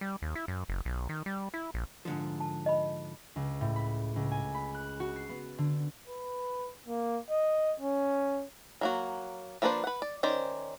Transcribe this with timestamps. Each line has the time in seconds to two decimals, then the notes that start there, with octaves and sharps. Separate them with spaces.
0.01 G3
0.22 D#2
0.35 E4
0.48 F#2
0.69 F#1
0.85 B1
1.09 D#3
1.26 G3
1.54 E4
1.74 A#1
2.05 G#2 D3 F3
2.40 A5
2.66 D#5 B5
3.36 C#2
3.61 A2
3.76 B5
4.16 C#2
4.31 G#5
4.54 B5
4.74 F#6
5.00 F#4
5.16 C7
5.29 B3
5.58 D3
6.08 B4
6.88 A#3
7.30 D#5
7.80 C#4
8.81 F#3 A#3 F#4
9.62 F3 A#3 D4 B4 C5
9.84 B4 F#5
10.02 D5
10.23 D#3 C#4 C5 D5